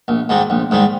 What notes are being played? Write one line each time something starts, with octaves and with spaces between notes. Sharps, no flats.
A#1
G#2 D#3 G3
A#1
G#2 D#3 G3